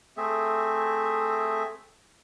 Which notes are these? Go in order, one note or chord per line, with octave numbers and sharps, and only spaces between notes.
A3 C4 G#4 E5